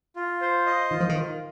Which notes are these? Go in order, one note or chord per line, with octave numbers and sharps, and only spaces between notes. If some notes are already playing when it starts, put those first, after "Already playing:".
F4
C5
D#5
D#3 F4
F3
D#3
F4